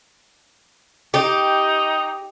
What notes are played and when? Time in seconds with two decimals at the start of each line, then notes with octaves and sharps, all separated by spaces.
1.14 D#4 G4